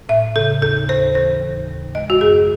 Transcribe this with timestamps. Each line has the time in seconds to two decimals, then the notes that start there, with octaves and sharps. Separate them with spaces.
0.09 A2 E5
0.36 C#3 A4
0.62 D#2 A4
0.89 D#2 C5
1.15 E3 C5
1.41 D#2
1.68 D#2
1.94 G#3 D#5
2.10 F#4
2.21 F#2 G#4